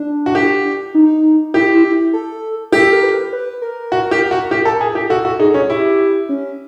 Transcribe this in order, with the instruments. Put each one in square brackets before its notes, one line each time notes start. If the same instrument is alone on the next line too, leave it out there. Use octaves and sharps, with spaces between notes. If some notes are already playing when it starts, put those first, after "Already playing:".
Already playing: [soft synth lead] D4
[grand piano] F#4
G4
[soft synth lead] D#4
[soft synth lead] E4 [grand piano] G4
[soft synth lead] E4
A4
[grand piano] G4 [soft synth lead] A4
[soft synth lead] A#4
B4
B4
A#4
[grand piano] F#4
G4
F#4
G4
A4
G#4
G4
[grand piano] F#4 [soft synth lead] A4
[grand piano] F#4
[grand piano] D#4 [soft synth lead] G#4
[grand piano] C#4
[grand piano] E4 [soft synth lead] G4
[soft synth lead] C#4